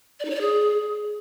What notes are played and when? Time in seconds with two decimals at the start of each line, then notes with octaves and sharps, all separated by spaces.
0.20 D5
0.25 D#4
0.30 C#5
0.35 D5
0.41 G#4